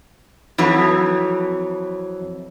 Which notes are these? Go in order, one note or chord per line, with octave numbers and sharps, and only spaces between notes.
F2 E3 F#3